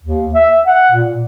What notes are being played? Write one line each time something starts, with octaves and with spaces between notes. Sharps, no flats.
D#2
E5
F#5
A#2